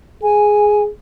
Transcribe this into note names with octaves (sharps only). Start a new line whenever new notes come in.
G#4 G#5